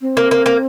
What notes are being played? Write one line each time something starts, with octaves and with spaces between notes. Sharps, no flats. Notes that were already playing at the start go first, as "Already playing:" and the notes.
C4
A#3
A#3
A#3